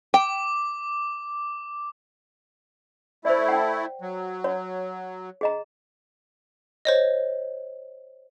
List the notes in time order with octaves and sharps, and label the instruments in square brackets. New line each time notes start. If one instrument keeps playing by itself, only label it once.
[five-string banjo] G5 [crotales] D6
[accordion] A3 E4 [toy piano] C5 D5
[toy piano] F#5 G5
[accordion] F#3
[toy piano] C#5
G#4 D#5 A#5
[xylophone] C5 C#5 D#5